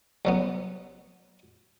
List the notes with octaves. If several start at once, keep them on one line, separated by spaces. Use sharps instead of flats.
C2 F#3 B3